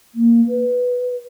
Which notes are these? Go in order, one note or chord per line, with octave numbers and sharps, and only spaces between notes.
A#3
B4